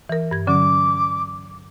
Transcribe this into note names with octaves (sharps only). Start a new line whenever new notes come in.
E3 A#4
G2 G#6
D3 F#3 C#4 D6